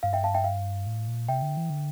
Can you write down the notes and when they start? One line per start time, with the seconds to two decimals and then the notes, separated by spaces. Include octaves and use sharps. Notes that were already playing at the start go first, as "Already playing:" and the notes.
0.03 G2 F5
0.13 E5 G5
0.24 F5 A5
0.34 E5 G5
0.44 F5
0.87 A2
1.08 A#2
1.29 C3 E5 G5
1.42 D3
1.57 E3
1.70 D3